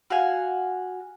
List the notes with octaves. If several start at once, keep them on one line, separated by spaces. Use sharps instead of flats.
F#4 F5 G#5